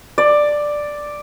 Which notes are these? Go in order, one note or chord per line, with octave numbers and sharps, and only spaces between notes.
D5